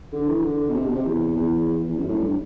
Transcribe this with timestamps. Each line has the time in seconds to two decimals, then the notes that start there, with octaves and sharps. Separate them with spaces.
0.13 D3
0.28 E3
0.44 D3
0.69 B2
0.74 C3
0.85 B2
0.95 C3
1.05 E2
1.36 E2
1.67 E2
1.88 E2
1.98 F#2
2.08 A2
2.18 G2